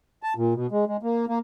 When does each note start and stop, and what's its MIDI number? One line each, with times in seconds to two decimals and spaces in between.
0.23 0.34 81
0.36 0.54 46
0.54 0.67 47
0.71 0.85 56
0.87 0.97 56
1.03 1.25 58
1.28 1.39 58